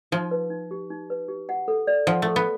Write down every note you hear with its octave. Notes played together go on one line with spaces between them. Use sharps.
F3 D#4
B4
D#4
G4
D#4
B4
G4
F#5
A4
D5
F3 F#5
A3 A4
B3